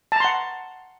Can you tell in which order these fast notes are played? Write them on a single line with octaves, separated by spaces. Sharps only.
A5 A#5 C6 F#5